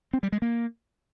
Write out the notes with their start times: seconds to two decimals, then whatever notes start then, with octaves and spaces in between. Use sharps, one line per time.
0.13 C4
0.23 G3
0.32 G#3
0.42 A#3